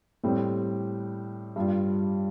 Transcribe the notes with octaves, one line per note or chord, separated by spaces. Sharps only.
A2 G3 C4
G2 G3 F4